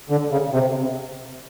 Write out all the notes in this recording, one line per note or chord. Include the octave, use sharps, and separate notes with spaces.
D3
C#3
C3